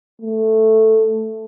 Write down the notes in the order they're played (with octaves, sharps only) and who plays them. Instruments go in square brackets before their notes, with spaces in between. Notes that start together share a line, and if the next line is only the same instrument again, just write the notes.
[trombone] A3